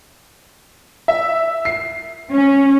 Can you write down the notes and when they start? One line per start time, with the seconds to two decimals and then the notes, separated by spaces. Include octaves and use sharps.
1.08 E5
1.65 C7
2.33 C#4